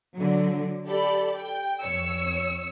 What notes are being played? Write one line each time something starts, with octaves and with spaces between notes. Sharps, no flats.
D3 F#3
G4 A4 D5 B5
G5
F2 C#5 E6 C#7